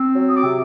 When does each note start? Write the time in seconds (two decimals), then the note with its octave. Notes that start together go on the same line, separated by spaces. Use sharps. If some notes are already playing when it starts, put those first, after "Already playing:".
Already playing: C4
0.16 F#3
0.29 D#6
0.36 D6
0.44 C3